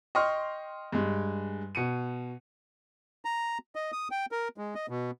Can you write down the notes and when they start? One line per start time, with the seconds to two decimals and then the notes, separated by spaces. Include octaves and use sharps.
0.15 D#5 G5 C6 C#6 F6
0.92 G2 G#3
1.75 B2 C#7 D#7
3.25 A#5
3.75 D#5
3.92 D#6
4.11 G5
4.32 A#4
4.58 G#3
4.75 D#5
4.89 B2